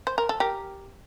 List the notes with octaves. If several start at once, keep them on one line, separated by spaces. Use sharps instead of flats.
C5
A#4
A4
G4 A#4